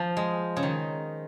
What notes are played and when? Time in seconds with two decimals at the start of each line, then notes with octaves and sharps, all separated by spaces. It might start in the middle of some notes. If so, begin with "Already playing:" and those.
Already playing: F3
0.17 G#3
0.57 C#3
0.63 D#3